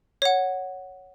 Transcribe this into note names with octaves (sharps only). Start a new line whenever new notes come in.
C#5 F#5